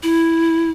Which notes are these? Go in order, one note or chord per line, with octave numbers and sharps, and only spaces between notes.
E4